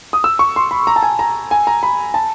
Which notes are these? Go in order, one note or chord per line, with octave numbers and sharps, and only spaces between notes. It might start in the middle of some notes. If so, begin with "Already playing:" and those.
D#6
E6
C#6
C6
B5
A#5
A5
G#5
A#5
G#5
A#5
B5
A5